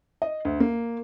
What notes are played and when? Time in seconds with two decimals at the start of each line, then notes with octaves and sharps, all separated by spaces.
0.22 D#5
0.45 D2
0.60 A#3